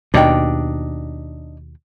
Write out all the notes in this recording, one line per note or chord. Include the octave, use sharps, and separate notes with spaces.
D#2 B2 D4 D#4 G5